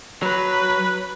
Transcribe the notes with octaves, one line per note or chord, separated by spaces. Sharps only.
F#3 B4